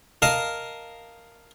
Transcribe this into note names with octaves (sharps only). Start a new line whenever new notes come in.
A#4 D#5 F5 A5